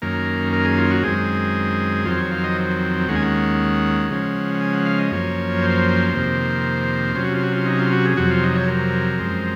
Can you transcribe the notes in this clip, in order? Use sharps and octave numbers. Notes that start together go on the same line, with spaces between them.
F#2 D#3 A#3 C#4 A#4
A#4
G#4
F4
F#4
F#2 D#3 G#3 C4 G#4
F2 D#3 F#3 C4 F4
C#5
F5
D#5
D#2 D#3 G#3 C#4 F#5
G#5
F#5
C#3 F3 G#3 C#4
F#5
G#5
F#5
F5
D#5
F#2 F3 A#3 C#4 C#5
C5
F2 C3 D#3 A#3
C3 F#3 C#4 F4
F#4
F4
F#4
F4
D#4
F4
F#4
G#4
F2 C3 F#3 F#4
F4
D#4
C#5
A#4
F#2 F3 G#3 C4